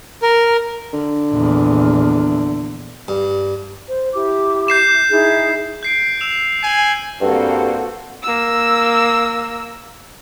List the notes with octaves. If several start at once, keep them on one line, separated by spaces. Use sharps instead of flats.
A#4
D3
A#1 E2
G2
C5
E4 G4 D6
G6 C7 E7
D#4 E4 G#4
G6 C7 D7
E6 E7 F7
G#5 C7 F#7
G2 A#3 C4 F#4 A4
A#3 E6